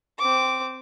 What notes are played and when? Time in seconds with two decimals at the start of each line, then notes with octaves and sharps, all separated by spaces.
0.19 C4 D6